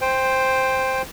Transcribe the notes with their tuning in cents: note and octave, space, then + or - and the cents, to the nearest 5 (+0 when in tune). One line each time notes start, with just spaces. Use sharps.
C5 +0 G5 +15